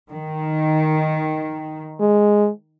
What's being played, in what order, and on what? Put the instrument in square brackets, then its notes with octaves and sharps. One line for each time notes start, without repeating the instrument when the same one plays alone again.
[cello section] D#3
[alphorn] G#3